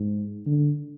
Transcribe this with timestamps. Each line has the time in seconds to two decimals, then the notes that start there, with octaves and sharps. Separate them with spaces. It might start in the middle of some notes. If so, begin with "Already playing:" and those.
Already playing: G#2
0.46 D3